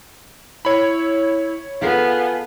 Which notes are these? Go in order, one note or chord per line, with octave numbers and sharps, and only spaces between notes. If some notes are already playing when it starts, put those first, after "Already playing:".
E4 C#5 B5
B3 F4 G#4 A4 F5